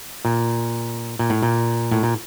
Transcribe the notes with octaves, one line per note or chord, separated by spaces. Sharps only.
A#2
A#2
A2
A#2
A2
A#2